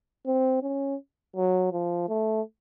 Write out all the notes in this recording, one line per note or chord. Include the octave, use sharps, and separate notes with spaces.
C4
C#4
F#3
F3
A3